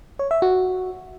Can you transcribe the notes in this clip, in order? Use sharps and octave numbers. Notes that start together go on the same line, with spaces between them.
C#5
E5
F#4